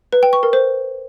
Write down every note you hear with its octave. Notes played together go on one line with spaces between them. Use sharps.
B4
G5
C#6
A#4
C5